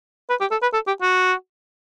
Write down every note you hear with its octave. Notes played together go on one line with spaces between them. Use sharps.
B4
G4
A4
B4
A4
G4
F#4